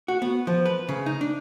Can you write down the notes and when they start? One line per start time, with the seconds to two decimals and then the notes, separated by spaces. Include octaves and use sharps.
0.08 F#4
0.22 B3
0.47 F3
0.65 B4
0.89 C#3
1.06 D#4
1.21 D4